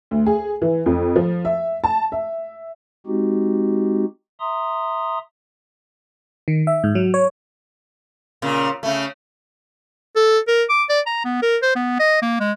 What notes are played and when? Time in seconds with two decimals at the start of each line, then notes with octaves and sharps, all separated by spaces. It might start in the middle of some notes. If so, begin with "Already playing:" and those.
0.11 D2
0.26 G#4
0.62 E3
0.86 F2
1.16 F3
1.45 E5
1.84 A5
2.12 E5
3.06 G#3 C4 D#4 F#4 G4
4.40 E5 A#5 C6 D#6
6.48 D#3
6.67 E5
6.84 G#2
6.95 F#3
7.14 C#5
8.42 A#2 C#3
8.83 C#3 A3
10.16 A4
10.48 A#4
10.69 D6
10.89 D5
11.07 A#5
11.25 B3
11.42 A#4
11.63 C5
11.76 B3
11.99 D#5
12.22 A#3
12.40 G#3